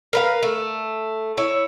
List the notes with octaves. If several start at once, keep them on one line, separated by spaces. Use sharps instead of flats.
A#4 B4 F5
A3
E4 C#5